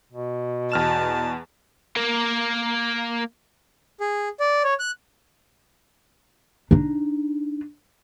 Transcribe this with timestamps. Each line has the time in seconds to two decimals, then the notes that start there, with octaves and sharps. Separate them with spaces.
0.12 B2
0.72 E2 A5 F6 E7
1.97 A#3 A#4
4.00 G#4
4.40 D5
4.64 C#5
4.80 F#6
6.71 D4 D#4